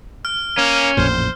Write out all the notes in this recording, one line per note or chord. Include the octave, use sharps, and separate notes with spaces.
F6
A#3 C#4
A1 F2 A#2 C5